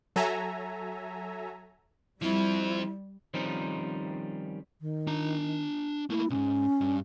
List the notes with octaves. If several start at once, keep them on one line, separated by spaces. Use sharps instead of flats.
F#3 A4 E5 G#5 A#5
F3 G3 C4 E4
D#3 F3 G3 C4 C#4 D#4
D#3
D4 A#5
A3 A#3 E4
B1 G#2 C#4
G2